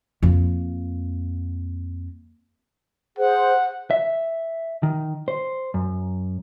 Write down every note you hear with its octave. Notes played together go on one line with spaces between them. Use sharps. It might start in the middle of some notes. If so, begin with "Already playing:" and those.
F2 A#3
G#4 C5 F#5
E5
D#3
C5
F#2